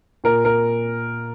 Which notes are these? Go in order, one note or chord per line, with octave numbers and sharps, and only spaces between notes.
A#2 A#4
A#4